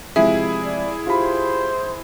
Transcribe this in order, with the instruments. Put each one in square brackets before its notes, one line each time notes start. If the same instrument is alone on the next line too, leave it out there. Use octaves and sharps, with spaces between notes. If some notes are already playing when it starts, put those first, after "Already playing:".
[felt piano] C3 F3 G#3 [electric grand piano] E4 G#4 [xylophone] E5
[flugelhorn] D5
[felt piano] F4 G4 B5 [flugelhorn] C5